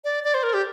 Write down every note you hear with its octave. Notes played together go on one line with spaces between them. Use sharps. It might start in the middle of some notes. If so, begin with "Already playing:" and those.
D5
D5
C5
A#4
G4